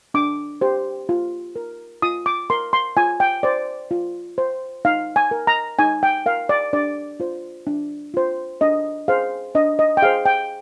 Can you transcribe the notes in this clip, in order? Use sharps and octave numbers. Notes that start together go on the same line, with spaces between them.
D4 D6
G4 C5
F4
A#4
F4 D#6
D6
A#4 C6
C6
F4 G#5
G5
C5 D5
F4
C5
D#4 F5
G#5
A#4
A#5
D#4 G#5
G5
A#4 F5
D5
D4 D5
F4 C5
D4
F4 C5
D4 D#5
G#4 C5 F5
D4 D#5
D#5
G5
G#4 C5 F5
G5